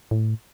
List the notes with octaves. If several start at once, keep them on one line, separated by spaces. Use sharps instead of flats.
A2